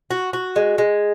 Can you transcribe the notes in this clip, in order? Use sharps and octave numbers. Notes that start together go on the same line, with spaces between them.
F#4
F#4
G#3
G#3